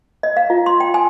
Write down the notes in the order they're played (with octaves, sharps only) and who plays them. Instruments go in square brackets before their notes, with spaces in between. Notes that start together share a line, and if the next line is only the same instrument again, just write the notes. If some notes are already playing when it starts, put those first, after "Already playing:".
[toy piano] D#5
F5
F4
C6
G5
G#5